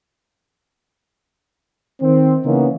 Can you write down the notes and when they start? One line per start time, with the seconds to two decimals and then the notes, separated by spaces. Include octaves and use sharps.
2.02 D#3 C4
2.45 C#3 E3 A#3 B3 C#4 D#4